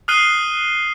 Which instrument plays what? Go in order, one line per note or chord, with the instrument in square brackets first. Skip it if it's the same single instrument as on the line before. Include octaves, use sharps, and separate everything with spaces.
[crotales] D#6 F6 F#6 C7 D#7 G7